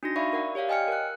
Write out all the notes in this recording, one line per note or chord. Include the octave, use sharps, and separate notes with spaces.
D4 D#4 F#4 A#6
D5 E5 F5 B5 C#6
A#4 D5 F#5
G4 C#5 D5 F5 F#5
D#5 G5 G#5 F6 C#7
A#4 F#6